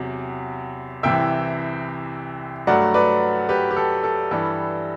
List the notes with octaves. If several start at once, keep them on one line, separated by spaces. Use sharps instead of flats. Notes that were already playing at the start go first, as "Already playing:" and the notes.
Already playing: E2 C3 F#3 F#5
C2 C3 E3 E5 G5
G2 F#3 A3 D5 F#5
B4 D5
G4 B4
G4
A4
A4
G2 E3 G3 A4